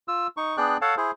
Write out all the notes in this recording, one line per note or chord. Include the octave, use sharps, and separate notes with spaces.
F4 E6
D#4 C#6
B3 D4 G#4 D5 G5 F#6
A4 C#5 F5 F#5 A5
E4 G#4 C5